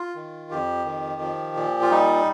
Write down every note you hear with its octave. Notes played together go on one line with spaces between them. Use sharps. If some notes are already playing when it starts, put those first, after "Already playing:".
Already playing: F4
D#3
F2 G4
D#3
F3
A#2
F4
G3 D#4